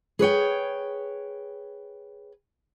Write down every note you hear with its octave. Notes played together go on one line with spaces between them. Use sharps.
G#4 B4 C#5 G5